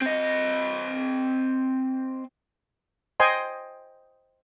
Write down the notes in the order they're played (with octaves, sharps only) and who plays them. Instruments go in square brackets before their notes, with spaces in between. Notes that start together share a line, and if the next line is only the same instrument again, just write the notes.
[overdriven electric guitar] C4 D#5
[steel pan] C5 D#5 G5 G#5 C6